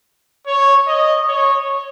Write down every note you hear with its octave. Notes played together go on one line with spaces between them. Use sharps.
C#5
D#5
C#5